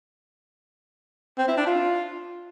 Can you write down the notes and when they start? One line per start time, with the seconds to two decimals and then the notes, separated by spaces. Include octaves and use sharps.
1.38 C4
1.48 E4
1.57 D4
1.67 F4